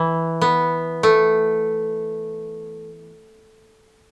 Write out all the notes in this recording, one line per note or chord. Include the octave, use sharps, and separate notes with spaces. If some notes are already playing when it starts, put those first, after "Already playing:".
Already playing: E3
B3
A3